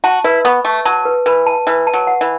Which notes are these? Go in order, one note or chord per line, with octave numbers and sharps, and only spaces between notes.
F#4 A5
E4 B4
B3 C#6
A3 C#6
F#3 A5
B4
E3 B4
A5
E3 B4
A5
F#3
F#5
E3